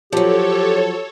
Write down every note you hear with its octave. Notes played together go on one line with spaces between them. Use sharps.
F3 F#3 G4 A4 C#5